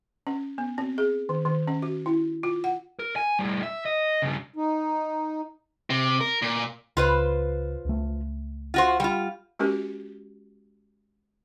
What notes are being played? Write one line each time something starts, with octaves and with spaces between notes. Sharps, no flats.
C#4
B3
C4
G#4
D#3
D#3
C#4
F#4
E4
F4
F#5
A#4
G#5
A2 G3
E5
D#5
G2 C#3
D#4
C3
A#4
A#2
C#2 F4 B4 C5
C#2 A3
F4 F#4 C5
G3 F4
G#3 C#4 F#4 G4 A#4